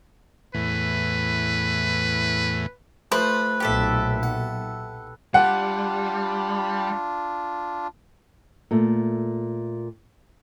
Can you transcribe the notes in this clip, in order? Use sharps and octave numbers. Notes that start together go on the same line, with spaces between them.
E2 A2 B4
F3 A3 B4 C5
B1 A#2 G4 A4 E5
F#5
G3 D4 F4 F#5
A#2 A3